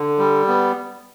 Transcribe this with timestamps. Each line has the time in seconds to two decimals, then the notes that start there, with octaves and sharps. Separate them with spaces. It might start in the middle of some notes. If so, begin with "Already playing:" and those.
Already playing: D3
0.19 G3
0.48 B3